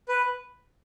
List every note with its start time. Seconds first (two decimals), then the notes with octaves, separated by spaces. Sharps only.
0.08 B4